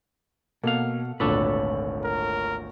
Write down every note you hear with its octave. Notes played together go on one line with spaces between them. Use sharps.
B2 A#3 A4 F5 F#5
G#1 D2 A#2 D4 A4 B4 C#5
A#4